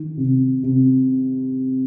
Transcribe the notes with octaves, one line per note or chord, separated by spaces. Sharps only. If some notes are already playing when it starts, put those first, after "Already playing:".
Already playing: D#3
C3
C3